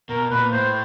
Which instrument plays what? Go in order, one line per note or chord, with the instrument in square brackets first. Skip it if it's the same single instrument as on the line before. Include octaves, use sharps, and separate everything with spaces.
[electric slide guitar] B2 [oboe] A#4
[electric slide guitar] A#2 [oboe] B4
[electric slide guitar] A2 [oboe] C5